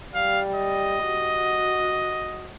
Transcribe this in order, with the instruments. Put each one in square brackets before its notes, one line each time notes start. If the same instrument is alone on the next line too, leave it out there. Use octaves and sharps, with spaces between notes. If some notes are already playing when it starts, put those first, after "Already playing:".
[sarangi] G3 [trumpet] F5
[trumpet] D#5
[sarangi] F#4